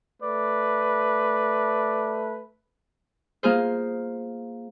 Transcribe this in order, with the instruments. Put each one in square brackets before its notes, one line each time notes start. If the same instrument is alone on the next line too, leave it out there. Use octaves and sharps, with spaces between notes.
[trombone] A3 [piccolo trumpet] B4 [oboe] D5
[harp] A#3 F4 G#4 C5